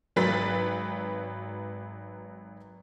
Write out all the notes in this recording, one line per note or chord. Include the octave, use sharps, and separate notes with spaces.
G#1 F#3 B4 A6 B6